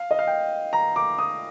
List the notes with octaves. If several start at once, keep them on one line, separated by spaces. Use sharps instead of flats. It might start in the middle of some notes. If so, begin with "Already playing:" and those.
Already playing: F5
D#5
F5
G5
A#5
D6
D#6